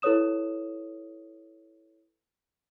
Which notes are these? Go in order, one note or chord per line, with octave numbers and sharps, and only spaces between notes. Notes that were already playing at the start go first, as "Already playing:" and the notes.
E4 A4 B4 C#5 D#6 E7